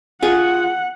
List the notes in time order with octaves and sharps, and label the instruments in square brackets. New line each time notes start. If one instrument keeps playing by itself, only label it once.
[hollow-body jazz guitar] F4 G#4 [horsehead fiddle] F#5